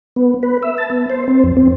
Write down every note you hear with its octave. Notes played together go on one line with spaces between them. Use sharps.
B3
B4
E5
A5
B3
C5
C4
F2
C4